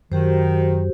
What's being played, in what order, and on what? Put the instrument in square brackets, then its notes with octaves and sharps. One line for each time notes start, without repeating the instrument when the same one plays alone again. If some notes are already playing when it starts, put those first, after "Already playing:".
[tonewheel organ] F#2 [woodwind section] D#3 [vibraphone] F#4 G4 C5